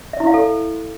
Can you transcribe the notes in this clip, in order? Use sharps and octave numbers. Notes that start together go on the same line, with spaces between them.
E5
E4
F5
A4